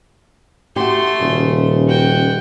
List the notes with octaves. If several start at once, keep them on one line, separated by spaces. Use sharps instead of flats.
A3 F#4 G4 C6
D#1 C#3
F#4 G5